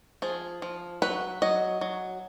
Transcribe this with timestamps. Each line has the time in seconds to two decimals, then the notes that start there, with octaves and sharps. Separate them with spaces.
0.22 F3 G#4
0.62 F3
1.02 F#3 B4
1.42 F#3 D#5
1.81 F#3